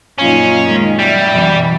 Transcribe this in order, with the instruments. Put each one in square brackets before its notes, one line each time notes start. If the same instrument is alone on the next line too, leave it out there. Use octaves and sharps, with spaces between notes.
[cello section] F#2 A#2 D#4 [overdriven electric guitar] C#4 [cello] F4
[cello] D#3 G#3
[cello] F#3 E5 [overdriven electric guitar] G3
[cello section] F#2 B2 E3